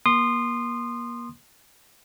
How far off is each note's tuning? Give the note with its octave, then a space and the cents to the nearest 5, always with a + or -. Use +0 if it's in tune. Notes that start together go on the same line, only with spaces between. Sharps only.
A#3 +30 C6 +0 D#6 -25